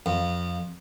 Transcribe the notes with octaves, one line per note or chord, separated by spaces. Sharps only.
F2